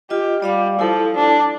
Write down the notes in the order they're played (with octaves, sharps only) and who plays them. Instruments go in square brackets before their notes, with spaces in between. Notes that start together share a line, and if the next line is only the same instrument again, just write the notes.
[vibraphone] F4 D#5 [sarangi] G4
[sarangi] G3 [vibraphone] D5 F5 D6
[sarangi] F3 [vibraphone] E4 A4
[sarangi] D4